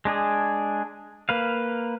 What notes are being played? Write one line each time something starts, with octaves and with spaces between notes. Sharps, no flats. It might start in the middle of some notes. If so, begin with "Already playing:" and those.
G#3 D4 G#4
A#3 B4 F5